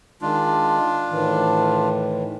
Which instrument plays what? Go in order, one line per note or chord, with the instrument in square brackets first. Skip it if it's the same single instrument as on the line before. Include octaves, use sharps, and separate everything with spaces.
[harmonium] D#3 G#3 [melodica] D4 F4
[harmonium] A2 D#3 E3